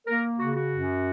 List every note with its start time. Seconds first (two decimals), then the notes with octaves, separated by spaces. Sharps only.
0.07 A#3 A#4
0.39 C#3 F#4
0.55 F#4
0.71 F#2